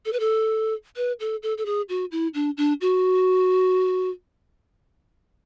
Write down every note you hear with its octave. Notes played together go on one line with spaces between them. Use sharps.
A4
B4
A4
B4
A4
A4
A4
G#4
F#4
E4
D4
D4
F#4